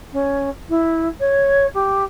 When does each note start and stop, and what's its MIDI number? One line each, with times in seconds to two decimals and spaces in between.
0.12 0.49 61
0.69 1.08 64
1.19 1.67 73
1.74 2.04 67